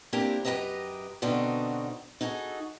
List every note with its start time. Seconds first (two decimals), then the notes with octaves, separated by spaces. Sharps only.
0.13 A#3 C4 D4 E4 G4 A#4
0.45 F#2 B2 G4 B4 D#5 A#5
1.22 B2 D3 C4 D4 D#4 F#4
2.21 D#4 F#4 G#4 A4